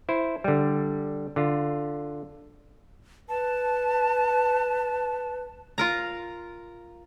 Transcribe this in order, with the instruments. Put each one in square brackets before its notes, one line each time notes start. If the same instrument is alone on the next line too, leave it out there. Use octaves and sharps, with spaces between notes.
[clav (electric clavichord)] E4 C5
D3 G3
D3 F4
[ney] B4 [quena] A5
[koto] F4 A#4 A#5